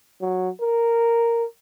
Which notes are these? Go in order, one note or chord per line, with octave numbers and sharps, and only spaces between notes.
F#3
A#4